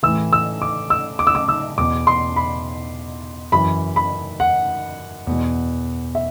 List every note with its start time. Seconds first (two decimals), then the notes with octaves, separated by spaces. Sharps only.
0.03 A2 E3 E6
0.33 E6
0.62 D6
0.90 E6
1.19 D6
1.27 E6
1.35 D6
1.49 E6
1.78 E2 B2 D6
2.07 C6
2.36 B5
3.52 F#2 E3 B5
3.96 B5
4.40 F#5
5.27 E2 B2
6.15 E5